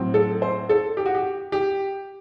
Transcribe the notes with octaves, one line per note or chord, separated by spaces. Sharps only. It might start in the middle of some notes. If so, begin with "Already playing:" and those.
Already playing: A2 F#3 C4
A4
C5
A4
G4
F#4
G4
G4